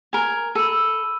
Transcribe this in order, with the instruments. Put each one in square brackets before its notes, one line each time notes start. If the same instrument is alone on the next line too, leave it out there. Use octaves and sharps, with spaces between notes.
[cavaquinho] A#4 G#5
[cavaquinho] A4 [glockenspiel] B5 E6 D#7